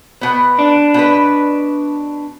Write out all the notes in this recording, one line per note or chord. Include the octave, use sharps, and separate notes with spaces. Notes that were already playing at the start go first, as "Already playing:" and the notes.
B2 B3
D4
B2 B4